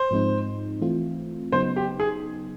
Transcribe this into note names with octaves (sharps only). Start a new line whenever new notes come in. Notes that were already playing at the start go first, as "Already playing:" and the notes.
Already playing: C5
G#2 F3 G#3 C4 D#4
E3 A3 C4 F4
C#3 F#3 B3 D#4 C5
G4
G#4